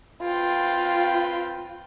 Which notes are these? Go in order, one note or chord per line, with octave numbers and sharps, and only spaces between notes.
C4 F4 B4 G5